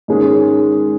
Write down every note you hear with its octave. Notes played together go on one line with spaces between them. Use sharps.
G#2 D#3 G#3 C#4 G#4